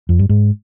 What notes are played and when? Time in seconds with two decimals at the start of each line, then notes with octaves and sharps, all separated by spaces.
0.09 F2
0.19 G2
0.29 G#2